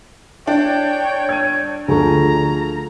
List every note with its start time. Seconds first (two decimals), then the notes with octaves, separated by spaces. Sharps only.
0.47 D4 C#5 G5
1.29 G#6 D#7
1.88 D2 F3 G#4 A4 A#5 C#6